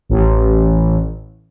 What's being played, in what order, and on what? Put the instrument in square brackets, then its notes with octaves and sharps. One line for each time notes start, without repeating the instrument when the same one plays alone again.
[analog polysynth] A1